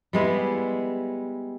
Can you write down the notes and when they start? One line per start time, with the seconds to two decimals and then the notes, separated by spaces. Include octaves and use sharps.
0.13 G3 G#3 B3 E4